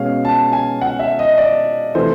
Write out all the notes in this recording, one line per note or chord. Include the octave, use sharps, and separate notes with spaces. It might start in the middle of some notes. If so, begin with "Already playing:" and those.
Already playing: B2 G#3 C#4 F5
A5
G#5
F#5
E5
D#5
D5
C3 E3 A3 C5